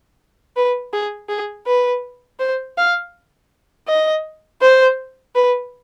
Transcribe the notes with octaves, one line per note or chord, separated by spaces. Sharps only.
B4
G#4
G#4
B4
C5
F5
D#5
C5
B4